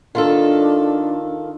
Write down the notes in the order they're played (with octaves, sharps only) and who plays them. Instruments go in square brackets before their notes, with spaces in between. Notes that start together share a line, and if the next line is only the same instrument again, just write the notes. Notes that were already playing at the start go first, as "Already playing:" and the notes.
[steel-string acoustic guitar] D#3 F4 A4 [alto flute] D4